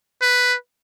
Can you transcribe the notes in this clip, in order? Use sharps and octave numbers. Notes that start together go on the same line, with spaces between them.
B4